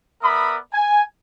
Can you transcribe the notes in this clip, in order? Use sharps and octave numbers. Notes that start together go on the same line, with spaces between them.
B3 A#4 D5 E5 B5 D#6
G#5